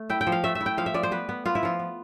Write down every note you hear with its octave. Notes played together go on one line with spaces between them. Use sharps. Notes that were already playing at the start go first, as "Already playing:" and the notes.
Already playing: A3
E4 G5
G5
F3
F5
A3 E5
E5
E4
G5
F3 F5
E5
F3 D5
C5
B3 B4
B3
B3 F4
E4
F3 F4
B3